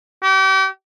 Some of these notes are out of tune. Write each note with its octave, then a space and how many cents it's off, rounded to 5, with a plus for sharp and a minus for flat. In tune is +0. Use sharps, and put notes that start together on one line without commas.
G4 -40